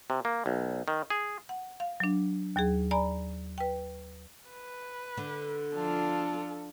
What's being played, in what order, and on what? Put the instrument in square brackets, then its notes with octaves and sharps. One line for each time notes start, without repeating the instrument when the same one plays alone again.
[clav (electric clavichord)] C3
A#3
B1
D#3
G#4
[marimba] F#5
F5
F#3 D4
D#2 F#3 G#4
D5 G#5 A#5 B5
B4 G5
[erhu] B4
[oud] D3
[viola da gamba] F3 D4 F4 [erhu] A4